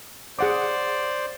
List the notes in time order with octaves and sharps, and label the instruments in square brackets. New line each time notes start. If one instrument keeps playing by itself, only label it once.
[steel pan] G#4 F#5 D6 [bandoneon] C5 D5